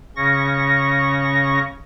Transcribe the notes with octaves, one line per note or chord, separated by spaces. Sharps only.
C#3 C#4 C#6 A#6